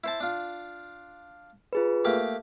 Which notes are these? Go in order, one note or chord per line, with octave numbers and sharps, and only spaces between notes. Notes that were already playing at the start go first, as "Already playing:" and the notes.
E4 C5 A5
D4 F4
F4 G#4 B4
A3 A#3 G4